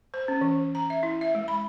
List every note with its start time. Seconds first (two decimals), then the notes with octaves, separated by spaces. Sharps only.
0.14 C5
0.28 C#4
0.41 E3
0.75 A#5
0.90 E5
1.03 E4
1.21 E5
1.35 G#3
1.48 B5